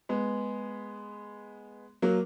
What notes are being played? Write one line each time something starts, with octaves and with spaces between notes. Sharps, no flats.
G#3 B3
F#3 A#3